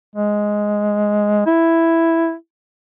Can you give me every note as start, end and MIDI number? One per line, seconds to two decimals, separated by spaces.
0.16 1.42 56
1.46 2.34 64